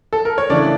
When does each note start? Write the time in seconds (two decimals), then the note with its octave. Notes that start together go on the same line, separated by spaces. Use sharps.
0.13 A4
0.25 A#4
0.38 C#5
0.50 C#3 E3 A3 D4 D5